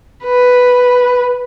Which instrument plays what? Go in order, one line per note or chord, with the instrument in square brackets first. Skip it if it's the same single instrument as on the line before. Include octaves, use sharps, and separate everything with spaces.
[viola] B4